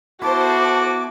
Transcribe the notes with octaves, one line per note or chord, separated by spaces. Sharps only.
B3 E4 F#4 A4 C5 A5 D6